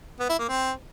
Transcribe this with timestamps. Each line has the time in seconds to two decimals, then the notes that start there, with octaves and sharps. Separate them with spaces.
0.20 B3
0.29 E4
0.39 A#3
0.48 C4